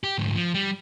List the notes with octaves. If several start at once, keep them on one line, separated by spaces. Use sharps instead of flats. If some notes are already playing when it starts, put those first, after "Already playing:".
G4
D2 G#2
F3
G3